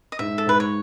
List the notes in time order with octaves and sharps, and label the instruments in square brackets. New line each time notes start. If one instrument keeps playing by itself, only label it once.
[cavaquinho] D#5
[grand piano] G#2 [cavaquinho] E5
[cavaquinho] A4
[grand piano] G#2 [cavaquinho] B4
[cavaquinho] C#5